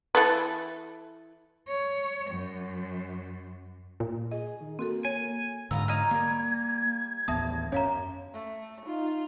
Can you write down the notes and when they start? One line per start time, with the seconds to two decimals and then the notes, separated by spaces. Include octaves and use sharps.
0.15 E3 A4 B4
1.68 C#5
2.30 F#2
4.00 A#2
4.31 G#4 D#5
4.61 D#3
4.79 A#3 C4 F#4 A4
5.05 C#5 G#5
5.71 G#2 D3 B3 F4 A#5 E6
5.88 C#4 D#4 A#5 F6 G#6 D#7
6.11 G3 A#3 A#4
7.28 A1 D#2 B3 E5 A5 D#6
7.72 F#2 C#4 C#5 F5 A#5
8.34 A3
8.86 D#4 F4